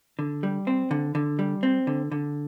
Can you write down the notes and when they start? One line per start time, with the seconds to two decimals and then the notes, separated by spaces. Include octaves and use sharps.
0.19 D3
0.43 G3
0.67 C4
0.91 D3
1.15 D3
1.39 G3
1.63 C4
1.87 D3
2.12 D3